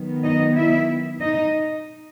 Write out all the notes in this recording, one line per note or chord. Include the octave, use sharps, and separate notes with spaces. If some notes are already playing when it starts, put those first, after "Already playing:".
Already playing: D#3 F#3 B3
D#4 D#5
E4 E5
D#4 D#5